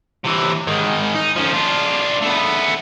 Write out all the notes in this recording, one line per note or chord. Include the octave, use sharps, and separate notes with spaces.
C3 E3
G#2 D#3
D#4
F3 C#4
D4 F4
A3 B3